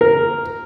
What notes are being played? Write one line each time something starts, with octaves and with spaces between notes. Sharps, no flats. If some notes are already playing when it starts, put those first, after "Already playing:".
A#4